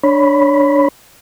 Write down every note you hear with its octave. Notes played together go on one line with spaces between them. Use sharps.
D4 C#5 B5